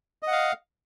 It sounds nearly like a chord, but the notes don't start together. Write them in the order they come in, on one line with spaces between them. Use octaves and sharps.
D#5 F#5 F5